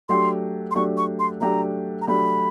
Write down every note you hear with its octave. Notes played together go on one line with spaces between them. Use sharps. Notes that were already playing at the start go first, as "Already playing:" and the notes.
F#3 A3 D4 G4 C6
C6
F#3 A3 D4 G4 C#6
C#6
C6
F#3 A3 D4 G4 A#5
A#5
F#3 A3 D4 G4 B5